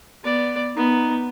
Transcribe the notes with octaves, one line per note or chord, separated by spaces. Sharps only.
B3 D5
B3 D#4